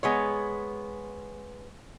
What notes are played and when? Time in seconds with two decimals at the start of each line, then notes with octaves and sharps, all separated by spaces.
0.03 G#3 B3 C#5